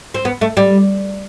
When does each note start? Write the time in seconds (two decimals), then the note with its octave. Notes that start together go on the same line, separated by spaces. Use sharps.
0.14 C4
0.25 B3
0.41 A3
0.57 G3